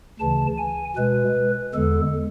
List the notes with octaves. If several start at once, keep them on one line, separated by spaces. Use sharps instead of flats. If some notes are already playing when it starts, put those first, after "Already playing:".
D2 C#3 E3 A5
G#5
B2 G#3 B4
E2 D3 G#3 A4